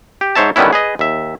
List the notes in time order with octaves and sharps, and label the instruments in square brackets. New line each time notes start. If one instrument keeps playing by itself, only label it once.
[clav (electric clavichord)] G4
G#2 C5 C#5 E5 A5
D3 D#3 G3 B3 C#4 E4
G#4 B4 D#5
D#2 E5